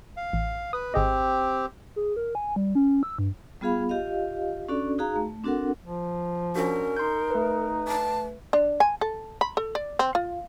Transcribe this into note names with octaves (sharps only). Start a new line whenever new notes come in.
F5
A1
B4 D#6
G#1 C4 G4 G#4 D#5
G#4
A#4
G#5
G3
C#4
E6
G2
G3 B3 F4 G#4 F5 B5
F4 G4 D#5 F5
C#4 D4 F#4 A4 D5
D#4 F#4 G#4 F5 A#5
A3
C4 D4 F#4 A4 A#4 F#5
F3
C#4 D4 F#4 A#4
D#4 C6 G6
A3 B4
A5
D4
G#5
A4
B5
A4
D5
C4
F4